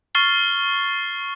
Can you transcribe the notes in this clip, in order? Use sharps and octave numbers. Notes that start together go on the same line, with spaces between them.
C#6 F6 A6 C7 G7